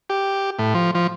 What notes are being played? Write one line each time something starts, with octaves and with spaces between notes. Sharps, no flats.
G4
A2
F3
F3